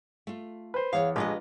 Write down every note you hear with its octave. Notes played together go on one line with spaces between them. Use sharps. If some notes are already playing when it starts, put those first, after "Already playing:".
A3 F4
B4 C5
E2 G#4 C#5 F5
A#1 G#3 G4 G#4 B4 D#5